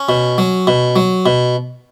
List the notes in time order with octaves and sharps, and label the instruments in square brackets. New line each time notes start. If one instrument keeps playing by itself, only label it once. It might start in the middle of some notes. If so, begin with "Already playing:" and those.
Already playing: [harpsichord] C#4
B2
F#3
B2
F#3
B2